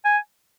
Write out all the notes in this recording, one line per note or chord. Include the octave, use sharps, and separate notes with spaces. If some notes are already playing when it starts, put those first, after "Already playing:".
G#5